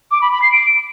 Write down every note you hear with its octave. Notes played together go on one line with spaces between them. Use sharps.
D6
B5
B5
C7
D7